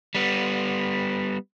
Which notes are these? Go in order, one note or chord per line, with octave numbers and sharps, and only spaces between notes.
G3 B3